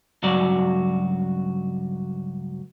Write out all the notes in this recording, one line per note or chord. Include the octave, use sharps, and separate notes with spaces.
C#2 G2 F#3 F#4 D5